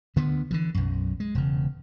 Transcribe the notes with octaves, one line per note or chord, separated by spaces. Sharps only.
D2 D3 B3
D3 E3 F3
B1 F#2
G#3
E1 C#3